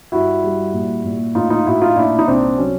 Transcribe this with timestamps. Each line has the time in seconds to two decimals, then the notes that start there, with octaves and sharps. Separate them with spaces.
0.12 G2 E4 F#4
0.43 G3
0.74 A#2
1.05 A#2
1.35 A2 D#4 F4
1.50 D#4 F4
1.65 A2 E4 F#4
1.82 D#4 F4
1.96 A#2 D4 E4
2.19 D#4
2.27 C2 C4 D4
2.58 F#3 C#4